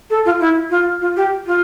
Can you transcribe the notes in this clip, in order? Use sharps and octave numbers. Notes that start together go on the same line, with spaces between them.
A4
F4
E4
F4
F4
G4
F4